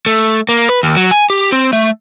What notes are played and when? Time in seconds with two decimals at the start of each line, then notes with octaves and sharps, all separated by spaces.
0.06 A3
0.49 A#3
0.69 B4
0.83 D#2
0.97 F#3
1.11 G#5
1.30 G4
1.52 C4
1.73 A3